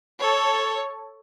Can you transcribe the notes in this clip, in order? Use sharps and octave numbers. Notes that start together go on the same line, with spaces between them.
A4 C#5